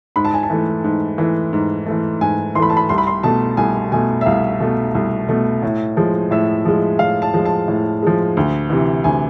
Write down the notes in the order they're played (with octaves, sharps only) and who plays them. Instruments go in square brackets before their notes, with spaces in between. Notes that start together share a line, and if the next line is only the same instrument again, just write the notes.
[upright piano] G#2 B5
A5
G#5
A5
E3 A3
G#2
E3 A3
G#2
E3 A3
G#2 G#5
E3 C6
A3 B5
A5
B5
C2 C6
B5
C6
B2 A3 A5
C2 G#5
B2 A3 G#5
E5
C2 F5
B2 A3
C2
B2 A3
A2
F3 G#3
A2 E5
F3 G#3
A2 F5
A5
F3 G#3
A5
A2
F3 G#3
D2
C3 E3
D2 G#5